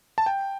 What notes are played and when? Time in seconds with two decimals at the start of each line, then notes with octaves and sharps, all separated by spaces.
0.18 A5
0.26 G5